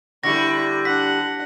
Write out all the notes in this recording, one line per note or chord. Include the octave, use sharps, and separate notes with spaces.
D3 G3 E4 C#6 A#6
D4 F#5 B6